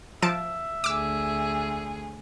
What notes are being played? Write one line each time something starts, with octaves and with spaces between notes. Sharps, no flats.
F3 E5 A5 D7
D2 G#4 D6 E6